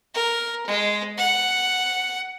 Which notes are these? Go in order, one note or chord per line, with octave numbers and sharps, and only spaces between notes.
A#4
G#3
F#5